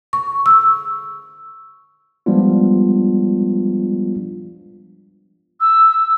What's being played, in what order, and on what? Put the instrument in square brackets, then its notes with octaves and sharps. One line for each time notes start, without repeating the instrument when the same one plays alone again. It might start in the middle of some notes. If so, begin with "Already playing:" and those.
[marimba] C#6
E6
[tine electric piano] F3 G3 G#3 B3 D4 F4
[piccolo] E6